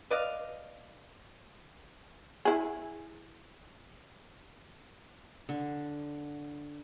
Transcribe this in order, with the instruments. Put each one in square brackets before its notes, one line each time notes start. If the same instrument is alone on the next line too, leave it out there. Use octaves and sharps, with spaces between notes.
[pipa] B4 D5 D#5 F5
[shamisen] E4 G#4
[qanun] D3